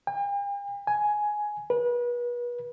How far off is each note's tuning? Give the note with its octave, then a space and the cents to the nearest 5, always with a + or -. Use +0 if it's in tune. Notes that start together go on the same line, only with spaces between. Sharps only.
G5 +45
G#5 +10
B4 -35